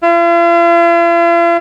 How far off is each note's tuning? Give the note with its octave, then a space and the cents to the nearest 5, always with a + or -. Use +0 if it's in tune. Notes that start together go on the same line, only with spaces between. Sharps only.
F4 -45